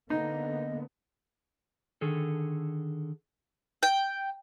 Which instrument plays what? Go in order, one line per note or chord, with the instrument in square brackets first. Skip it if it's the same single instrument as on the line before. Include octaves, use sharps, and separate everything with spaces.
[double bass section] D3 A#3 B3 [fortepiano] D#4 [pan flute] D#5
[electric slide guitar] D3 D#3 G#4 A4
[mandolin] G5